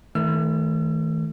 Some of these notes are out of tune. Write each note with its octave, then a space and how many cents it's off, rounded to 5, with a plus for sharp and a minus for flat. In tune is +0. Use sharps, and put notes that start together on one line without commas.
D#3 +40 A3 +0 E6 +45